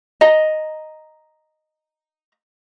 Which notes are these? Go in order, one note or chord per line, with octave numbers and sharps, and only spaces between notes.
D#5 A#5